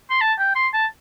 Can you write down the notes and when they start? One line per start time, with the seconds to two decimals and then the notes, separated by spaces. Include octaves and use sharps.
0.10 C6
0.21 A5
0.39 G5
0.55 C6
0.73 A5